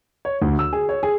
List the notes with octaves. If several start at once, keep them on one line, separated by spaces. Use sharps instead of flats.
C#5
D2
E6
G#4
C#5
G#4